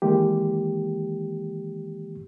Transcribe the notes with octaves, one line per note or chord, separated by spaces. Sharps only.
D#3 E3 G#3 A#3 G4